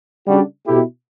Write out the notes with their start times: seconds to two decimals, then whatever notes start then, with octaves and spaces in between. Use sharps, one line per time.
0.27 C#3 G3 D4 F#4
0.66 B2 A3 E4 G4